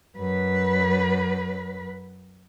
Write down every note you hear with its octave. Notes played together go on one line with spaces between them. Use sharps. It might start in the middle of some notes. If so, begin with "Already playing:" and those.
F#2 B4